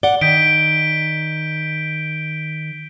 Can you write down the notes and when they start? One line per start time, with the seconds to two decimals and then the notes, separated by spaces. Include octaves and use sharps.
0.03 D5 F#5 G7
0.21 D#3 G6 B6 D7